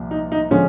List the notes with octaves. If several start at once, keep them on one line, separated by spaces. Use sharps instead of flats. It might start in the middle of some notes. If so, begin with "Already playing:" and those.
Already playing: C2 A#2 F3
D#4
D#4
D3 F3 G#3 C#4